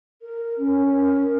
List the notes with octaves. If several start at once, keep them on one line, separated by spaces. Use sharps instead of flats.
A#4
C#4
A#4